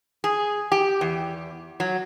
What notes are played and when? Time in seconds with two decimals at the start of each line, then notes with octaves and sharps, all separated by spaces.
0.24 G#4
0.72 G4
1.01 E2
1.80 F#3